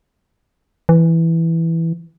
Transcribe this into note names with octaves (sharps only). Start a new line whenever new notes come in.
E3